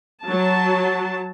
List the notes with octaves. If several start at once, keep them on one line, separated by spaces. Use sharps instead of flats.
F#3 A5